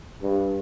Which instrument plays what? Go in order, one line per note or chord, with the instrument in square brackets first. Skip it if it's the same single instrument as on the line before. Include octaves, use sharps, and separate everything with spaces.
[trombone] G2